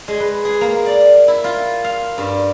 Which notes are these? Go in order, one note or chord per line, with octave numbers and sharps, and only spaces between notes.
G#3
B4
G#4
A#3
D5
E4
F4
F5
G2